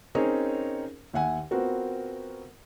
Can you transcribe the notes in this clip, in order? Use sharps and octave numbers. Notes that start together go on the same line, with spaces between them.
C4 C#4 D#4 G#4 A#4 C#5
D#2 E5 F#5 G#5
B3 C4 F4 F#4 A#4